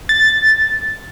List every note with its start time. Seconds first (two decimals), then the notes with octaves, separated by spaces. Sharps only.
0.09 A6